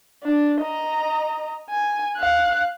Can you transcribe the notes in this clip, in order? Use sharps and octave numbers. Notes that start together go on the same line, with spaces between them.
D4
D#5 A#5
G#5
F5 F#6